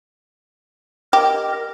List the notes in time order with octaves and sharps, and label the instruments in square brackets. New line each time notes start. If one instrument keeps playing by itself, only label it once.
[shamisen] G4 [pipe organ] A#4 D#5